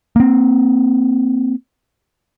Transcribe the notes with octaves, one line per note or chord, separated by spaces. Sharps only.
A#3 C4